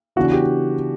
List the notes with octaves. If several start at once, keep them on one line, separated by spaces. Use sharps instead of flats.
C#3 E3 B3 D4 F#4
G4